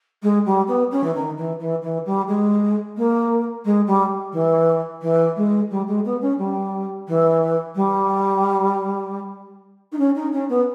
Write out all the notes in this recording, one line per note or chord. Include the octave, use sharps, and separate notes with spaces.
G#3
G3
B3
C#4
E3
D#3
E3
E3
E3
G3
G#3
A#3
G#3
G3
E3
E3
G#3
G3
G#3
B3
C#4
G3
E3
G3
D#4
C#4
D#4
C#4
B3